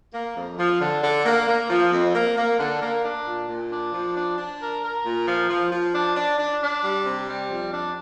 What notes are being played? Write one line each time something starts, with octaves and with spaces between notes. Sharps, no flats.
A#3
F2
F3
D3
D3
A#3
A#3
F3
F2
A#3
A#3
D3
A#3
D4
A#2
A#2
D4
F3
D4
D4
A#4
A#4
A#2
F3
F3
F3
D4
D4
D4
D4
G3
C3
G3
F2
D4